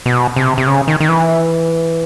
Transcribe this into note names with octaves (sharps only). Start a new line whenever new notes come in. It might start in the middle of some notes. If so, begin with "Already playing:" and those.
B2
C3
C3
C#3
D#3
D#3
E3